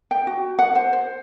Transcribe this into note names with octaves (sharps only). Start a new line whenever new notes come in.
G5
F#4
F#5
C5
C5